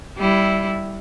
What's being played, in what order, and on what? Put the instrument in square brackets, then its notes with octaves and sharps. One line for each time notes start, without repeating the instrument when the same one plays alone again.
[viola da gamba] G3 E4